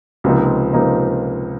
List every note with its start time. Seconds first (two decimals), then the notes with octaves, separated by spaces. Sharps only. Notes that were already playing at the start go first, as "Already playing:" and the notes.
0.24 C#2 C3 F3 A#3 D#4
0.73 C#2 C3 F3 A#3 D#4